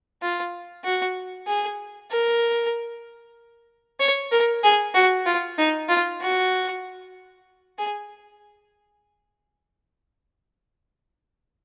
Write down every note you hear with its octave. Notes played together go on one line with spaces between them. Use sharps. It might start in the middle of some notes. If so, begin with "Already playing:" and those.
F4
F#4
G#4
A#4
C#5
A#4
G#4
F#4
F4
D#4
F4
F#4
G#4